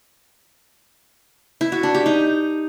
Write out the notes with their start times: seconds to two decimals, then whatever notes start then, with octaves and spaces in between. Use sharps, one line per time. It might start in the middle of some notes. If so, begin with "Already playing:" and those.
1.61 E4
1.72 F#4
1.83 D4
1.95 G4
2.06 D#4